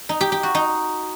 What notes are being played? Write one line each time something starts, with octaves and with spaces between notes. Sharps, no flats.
D#4
G4
G4
F#4
D#4